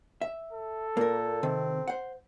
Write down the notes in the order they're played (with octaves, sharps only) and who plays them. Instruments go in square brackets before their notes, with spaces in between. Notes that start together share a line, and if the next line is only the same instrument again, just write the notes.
[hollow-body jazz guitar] E5
[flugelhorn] A4
[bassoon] A#2 [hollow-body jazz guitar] A#3 A#4
[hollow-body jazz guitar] C3 D#3 [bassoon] C4
[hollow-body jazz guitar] C5 F#5